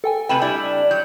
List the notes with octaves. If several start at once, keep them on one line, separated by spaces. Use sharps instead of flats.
A4 G5 G#5
C3 A3 B4 G5 E7 F#7
G3 D4 E4
F#3 G6